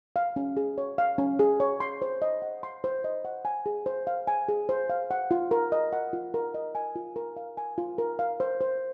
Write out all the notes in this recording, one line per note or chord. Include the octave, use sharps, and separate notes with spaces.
F5
C#4
G#4
C#5
F5
C#4
G#4
C#5
C6
C5
D#5
F#5
C6
C5
D#5
F#5
G#5
G#4
C5
F5
G#5
G#4
C5
F5
F#5
F4
A#4
D#5
F#5
F4
A#4
D#5
G#5
F4
A#4
F5
G#5
F4
A#4
F5
C5
C5